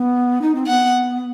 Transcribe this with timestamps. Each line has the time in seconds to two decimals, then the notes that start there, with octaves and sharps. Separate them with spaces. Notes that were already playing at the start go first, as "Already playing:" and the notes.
Already playing: B3
0.41 D#4
0.55 C4
0.67 B3 F#5